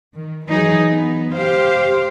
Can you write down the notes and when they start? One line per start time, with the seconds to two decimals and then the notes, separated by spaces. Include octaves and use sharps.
0.14 D#3
0.47 E3 F#3 D#4 G#4
0.91 B3
1.34 G4 C5 F5